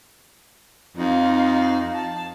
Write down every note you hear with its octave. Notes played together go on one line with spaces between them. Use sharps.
F2 D#4 F5
A5